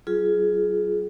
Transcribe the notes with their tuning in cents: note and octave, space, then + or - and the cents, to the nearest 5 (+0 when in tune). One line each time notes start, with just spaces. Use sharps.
F#3 +45 F4 +0 G#4 +15